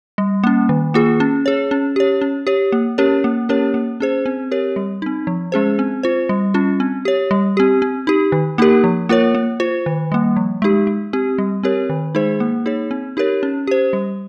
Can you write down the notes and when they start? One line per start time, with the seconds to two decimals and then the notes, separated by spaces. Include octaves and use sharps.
0.18 G3
0.44 A#3 C#4
0.69 D#3
0.94 A#3 F4 G#4
1.20 C#4
1.46 G#4 C#5
1.71 C#4
1.96 G4 C#5
2.21 C#4
2.47 G4 C#5
2.72 A#3
2.98 C#4 G4 A#4 C#5
3.24 A#3
3.49 C#4 G4 A#4 C#5
3.74 A#3
4.00 C#4 G#4 C5
4.26 C4
4.51 G4 A#4 C#5
4.76 G3
5.02 C4 D#4
5.27 F3
5.52 G#3 C#4 G#4 C5
5.79 C4
6.03 F4 C5
6.29 G3
6.54 C#4 F4
6.80 C4
7.05 G4 C#5
7.31 G3
7.57 C4 G4
7.82 C4
8.07 D#4 G4
8.32 D#3
8.58 A#3 D#4 G4 A#4
8.84 F3
9.09 A#3 F4 A#4 C#5
9.35 A#3
9.60 F4 C5
9.86 D#3
10.12 G3 A#3
10.36 F3
10.62 G#3 D#4 G4
10.87 G#3
11.13 C4 G4
11.38 G3
11.63 C4 G4 A#4 C#5
11.90 D#3
12.15 G#3 D#4 G#4 C5
12.40 A#3
12.66 D#4 G#4 C#5
12.91 C4
13.17 D#4 G4 A#4 C#5
13.43 C#4
13.67 G4 C5
13.93 G3